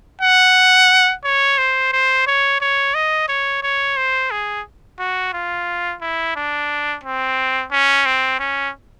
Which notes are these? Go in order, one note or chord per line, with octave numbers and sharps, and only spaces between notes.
F#5
C#5
C5
C5
C#5
C#5
D#5
C#5
C#5
C5
G#4
F#4
F4
E4
D4
C4
C#4
C4
C#4